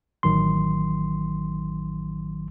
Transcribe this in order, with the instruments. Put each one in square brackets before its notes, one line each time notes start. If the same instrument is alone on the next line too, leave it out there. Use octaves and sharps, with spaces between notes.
[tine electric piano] A1 D#3 F#3 C6